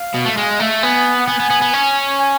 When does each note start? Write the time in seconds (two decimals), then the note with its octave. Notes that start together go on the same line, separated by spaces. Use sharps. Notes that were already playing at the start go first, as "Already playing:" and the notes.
Already playing: F5
0.15 B2
0.26 A3
0.38 G#3
0.60 A3
0.82 B3 G#5
1.20 F#5
1.28 B3 G#5
1.39 B3
1.50 B3
1.62 B3
1.73 C#4
2.19 G#5